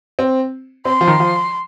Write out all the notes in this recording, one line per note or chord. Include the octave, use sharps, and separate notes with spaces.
C4
C4 C6
F3
D#3
F3